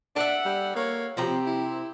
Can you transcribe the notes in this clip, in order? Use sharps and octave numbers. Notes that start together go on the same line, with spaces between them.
D4 A4 E5 F#5
G3
A#3 C#5
C3 F3 C4 G4 A#5
E4